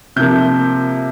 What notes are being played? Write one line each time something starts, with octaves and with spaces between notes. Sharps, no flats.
C3 F3 A#3 G6